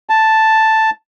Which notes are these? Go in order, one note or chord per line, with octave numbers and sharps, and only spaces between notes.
A5